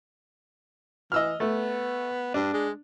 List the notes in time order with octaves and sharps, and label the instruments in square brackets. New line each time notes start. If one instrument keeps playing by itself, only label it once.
[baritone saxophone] E3 [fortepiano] D#5 E6 F6
[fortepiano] A3 [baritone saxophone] B3
[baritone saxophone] G2 [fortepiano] D4
[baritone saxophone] G#3